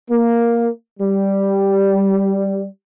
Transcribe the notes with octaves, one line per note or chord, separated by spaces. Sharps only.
A#3
G3